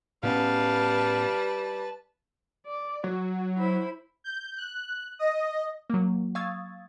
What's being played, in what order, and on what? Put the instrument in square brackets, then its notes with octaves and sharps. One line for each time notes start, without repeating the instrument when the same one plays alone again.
[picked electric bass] A2 B3 C#4 [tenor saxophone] G3 [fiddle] B4 A5 [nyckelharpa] F5
[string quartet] D5
[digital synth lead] F#3 [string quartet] F#4
[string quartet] E4 C5 B5
[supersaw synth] G6
F#6
D#5
[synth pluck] F#3 A#3
F5 C#6 D#6 E6 G#6 A6